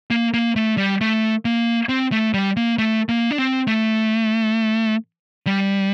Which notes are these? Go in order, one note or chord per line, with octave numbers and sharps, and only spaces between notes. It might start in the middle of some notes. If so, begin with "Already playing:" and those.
A#3
A#3
A3
G3
A3
A#3
C4
A3
G3
A#3
A3
A#3
D4
C4
A3
G3